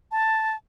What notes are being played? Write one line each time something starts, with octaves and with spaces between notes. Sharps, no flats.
A5